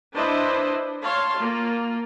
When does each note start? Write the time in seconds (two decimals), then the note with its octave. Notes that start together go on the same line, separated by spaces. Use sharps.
0.15 D4 E4 B4 C5 D#5
1.03 C#5 F5 A5 C6
1.38 A#3 F4